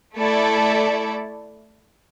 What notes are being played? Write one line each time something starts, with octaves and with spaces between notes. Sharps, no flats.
A3 E4 A4 D5